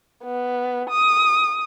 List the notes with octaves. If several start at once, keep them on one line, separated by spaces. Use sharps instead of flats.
B3
D#6